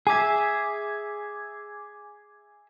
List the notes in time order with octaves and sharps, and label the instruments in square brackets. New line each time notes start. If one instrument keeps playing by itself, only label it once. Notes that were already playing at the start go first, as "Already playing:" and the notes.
[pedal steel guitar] G#4 E5 [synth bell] G#5 D6 G#6